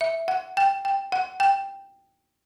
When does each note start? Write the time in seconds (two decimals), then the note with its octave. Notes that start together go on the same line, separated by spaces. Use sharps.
0.01 E5
0.28 F#5
0.57 G5
0.85 G5
1.12 F#5
1.40 G5